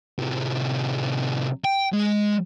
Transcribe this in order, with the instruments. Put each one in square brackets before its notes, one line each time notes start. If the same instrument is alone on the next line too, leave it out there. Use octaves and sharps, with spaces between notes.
[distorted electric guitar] A2 C3
G5
G#3